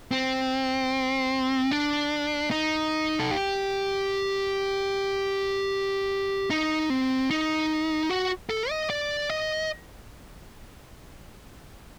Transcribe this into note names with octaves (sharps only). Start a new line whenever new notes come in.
C4
D4
D#4
A4
G4
D#4
C4
D#4
F#4
A4
D#5
D5
D#5